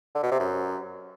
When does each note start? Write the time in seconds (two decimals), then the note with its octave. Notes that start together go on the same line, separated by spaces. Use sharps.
0.15 D3
0.23 B2
0.31 C3
0.40 F#2